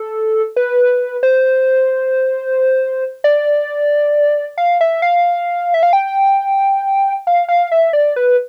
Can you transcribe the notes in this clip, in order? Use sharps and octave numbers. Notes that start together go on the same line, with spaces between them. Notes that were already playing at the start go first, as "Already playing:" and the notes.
Already playing: A4
B4
C5
D5
F5
E5
F5
E5
F5
G5
F5
F5
E5
D5
B4